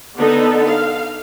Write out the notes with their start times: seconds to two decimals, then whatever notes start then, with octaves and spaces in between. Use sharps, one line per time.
0.17 D3 B3 D#4 A4
0.66 F5